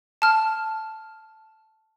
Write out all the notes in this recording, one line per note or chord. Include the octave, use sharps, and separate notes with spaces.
A5 F6